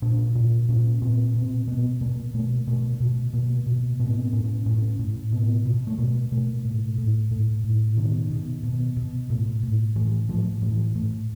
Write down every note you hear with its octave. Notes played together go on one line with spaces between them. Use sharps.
A#2 D4
A#2
A#2 C#4
A#2 C4
B2 C4
B2 B3
B2 A#3
B2 A3
B2 A3
B2
B2 A#3
B2
A2 B3
C4
B3
A2 C#4
A2 C#4
A2
B2 B3
B2
A3
B2 A#3
B2 A3
A2
A2
A2
A2
B2 D#3
B2
B2
B2
A2
A2
A2 E3
A2 F3
A2 E3
A2